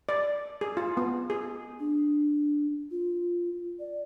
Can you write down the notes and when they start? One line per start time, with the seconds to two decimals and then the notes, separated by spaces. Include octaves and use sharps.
0.09 D5
0.61 G#4
0.77 F4
0.97 B3
1.30 G#4
1.80 D4
2.91 F4
3.80 D5